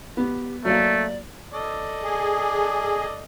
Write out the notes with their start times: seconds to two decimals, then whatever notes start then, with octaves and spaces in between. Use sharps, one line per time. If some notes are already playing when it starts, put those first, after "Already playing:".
0.17 B3 G4
0.65 F#3 A3 A#3 D5
1.54 A4 D5 D#5
2.04 G#4